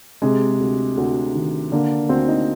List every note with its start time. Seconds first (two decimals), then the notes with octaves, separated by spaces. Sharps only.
0.22 C3 G#3
0.60 D2
0.97 D2
1.35 D#3
1.72 D3 A#3
2.09 D2 C4
2.28 D#4